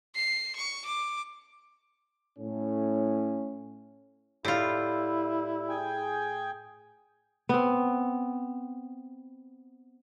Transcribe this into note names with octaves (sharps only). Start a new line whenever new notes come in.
C7
C#6
D6
A2 C#4
A2 E4 F4 G4 D5 E6
G#4 G5 G#5
B3 C4